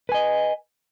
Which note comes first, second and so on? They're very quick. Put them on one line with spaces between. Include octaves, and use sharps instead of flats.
B4 G#5 D#5